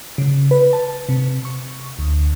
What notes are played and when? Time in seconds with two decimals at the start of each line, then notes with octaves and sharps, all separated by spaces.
0.18 C#3
0.51 B4
0.73 A5
1.09 C3
1.45 C#6
1.99 D2